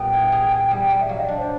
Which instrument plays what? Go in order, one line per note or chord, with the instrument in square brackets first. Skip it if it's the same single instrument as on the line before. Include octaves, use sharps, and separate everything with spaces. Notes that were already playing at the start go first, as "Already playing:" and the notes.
Already playing: [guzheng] A#2 G3 B3 [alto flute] G5
[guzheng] E4
G#4
G#4
G3
G3
[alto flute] E5
[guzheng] F#3 [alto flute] F5
[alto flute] D#5
[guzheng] D4 [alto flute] D5
[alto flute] C5